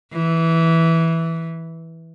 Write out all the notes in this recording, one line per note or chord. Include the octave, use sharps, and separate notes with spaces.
E3